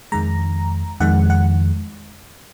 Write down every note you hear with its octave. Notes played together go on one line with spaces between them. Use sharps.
F2 D#3 G#3 A#5
F2 D#3 G#3 F#5
F#5